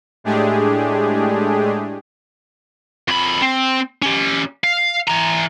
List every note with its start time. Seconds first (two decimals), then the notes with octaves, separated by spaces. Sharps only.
0.24 A2 G#3 A3 D4 G4 G#4
3.08 F2 B5
3.42 C4
4.02 C#4 G4
4.64 F5
5.08 E3 A#5